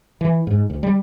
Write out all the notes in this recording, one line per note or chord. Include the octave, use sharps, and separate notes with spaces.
E3
G#2
D2
G3